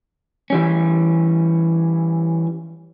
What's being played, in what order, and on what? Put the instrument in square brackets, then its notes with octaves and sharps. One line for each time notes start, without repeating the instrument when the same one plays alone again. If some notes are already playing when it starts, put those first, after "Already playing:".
[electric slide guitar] E3 G3 C#4